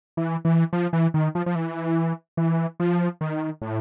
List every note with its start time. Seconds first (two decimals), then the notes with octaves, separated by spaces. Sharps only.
0.17 E3
0.45 E3
0.73 F3
0.93 E3
1.14 D#3
1.35 F3
1.46 F3
1.55 E3
2.37 E3
2.80 F3
3.21 D#3
3.62 A2